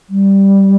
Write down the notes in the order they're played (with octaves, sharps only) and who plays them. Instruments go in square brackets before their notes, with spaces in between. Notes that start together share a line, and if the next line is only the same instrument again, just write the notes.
[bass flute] G3